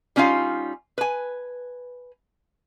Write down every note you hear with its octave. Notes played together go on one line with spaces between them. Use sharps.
G3 C#4 D#4 F4 F5
B4 G#5